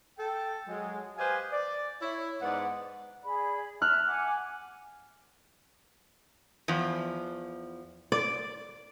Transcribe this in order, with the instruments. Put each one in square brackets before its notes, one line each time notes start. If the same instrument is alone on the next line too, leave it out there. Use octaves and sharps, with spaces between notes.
[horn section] A4 G5
F#3 G#3
G4 B4 C5 D#5 F5 G#5
D5
E4 C#5
G#2 B3 D5 D#5 F#5
[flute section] G#4 D5 B5
[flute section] E5 A5 [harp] F6 F#6
[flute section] F#5 G#5 D6
[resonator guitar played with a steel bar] E2 F3
[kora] D5